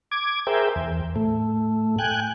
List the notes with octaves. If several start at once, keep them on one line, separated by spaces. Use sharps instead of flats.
D6 G#6
G#4 A#4 C5 E5 G5
E2
A2 A3
G5 G#5 F#6